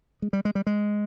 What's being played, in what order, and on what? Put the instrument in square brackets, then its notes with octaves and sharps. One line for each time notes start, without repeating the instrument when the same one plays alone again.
[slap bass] G#3
G3
G#3
G3
G#3